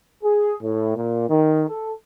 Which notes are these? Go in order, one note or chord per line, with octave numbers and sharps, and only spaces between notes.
G#4
A2
A#2
D#3
A4